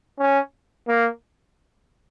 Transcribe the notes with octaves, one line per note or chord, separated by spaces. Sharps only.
C#4
A#3